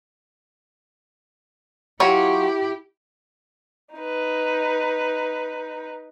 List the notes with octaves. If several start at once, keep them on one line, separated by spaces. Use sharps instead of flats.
F#3 E4 F4 G4 C#5
D#4 B4